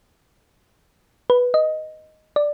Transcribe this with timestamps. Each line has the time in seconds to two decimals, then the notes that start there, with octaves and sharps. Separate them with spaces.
1.30 B4
1.54 D#5
2.36 D5